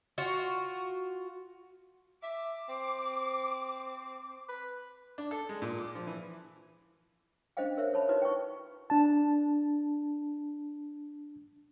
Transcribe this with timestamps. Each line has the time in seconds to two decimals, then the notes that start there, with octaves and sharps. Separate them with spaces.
0.18 F4 F#4
2.23 E5 D6
2.69 C4
4.49 B4
5.18 D4
5.31 A4
5.49 G#3
5.62 A#2
5.78 D6
5.95 F3
6.07 E3
7.57 C#4 D4 C5 D#5 F5 G5
7.77 A#4 C5 C#5 E5
7.94 C#5 A5 B5
8.09 D#4 E4 F#4 B4 C#5
8.22 G5 C#6
8.90 D4 A5